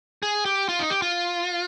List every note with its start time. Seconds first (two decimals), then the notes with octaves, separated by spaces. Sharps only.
0.23 G#4
0.45 G4
0.69 F4
0.79 D#4
0.90 G4
1.02 F4